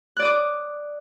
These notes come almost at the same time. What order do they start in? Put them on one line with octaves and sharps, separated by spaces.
F#6 D5 D#6 D6